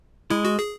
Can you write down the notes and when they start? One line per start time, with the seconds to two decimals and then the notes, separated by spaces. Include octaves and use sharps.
0.30 G#3 E4
0.45 F#4
0.59 G#4